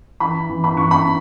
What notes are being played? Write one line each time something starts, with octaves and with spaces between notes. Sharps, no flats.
E3 B5
E3
B5
E3 C#6
B5